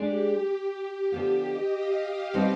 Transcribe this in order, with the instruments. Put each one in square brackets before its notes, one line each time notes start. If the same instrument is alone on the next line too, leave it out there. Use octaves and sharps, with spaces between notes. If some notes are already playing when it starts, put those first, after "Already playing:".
Already playing: [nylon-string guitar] G#3 D4 G#4 D5 [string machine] G4
[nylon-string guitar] D3 F3 B3 F4 [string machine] G4
[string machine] D#5
F5
[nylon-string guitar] B2 G3 C4 D#4